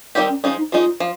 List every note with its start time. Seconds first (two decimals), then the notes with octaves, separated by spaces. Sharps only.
0.15 D#3 G3 C4 D#4 G4
0.30 C#4
0.43 F3 G#3 C#4 D#4
0.58 D#4
0.72 F3 G#3 D#4 F4
1.00 F3